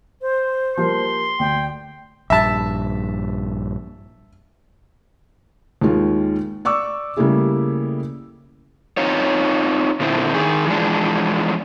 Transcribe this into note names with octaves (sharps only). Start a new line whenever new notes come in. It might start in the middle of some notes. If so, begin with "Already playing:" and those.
C5
F3 G3 A#3 C6
D2 G5
A#1 G2 E5 A5
D#2 D#3 G#3 F4
D5 C#6 D6 E6
C#3 G3 A3 A#3 E4 G#4
C4 D#4 F4 C#5
A#2 D3 C4 E4
D#3 G#4
E3 F3 G#3 D4